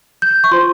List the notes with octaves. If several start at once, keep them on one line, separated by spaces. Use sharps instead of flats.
G6
C#6
F4 C5 C6